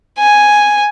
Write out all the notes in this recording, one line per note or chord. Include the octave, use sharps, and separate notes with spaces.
G#5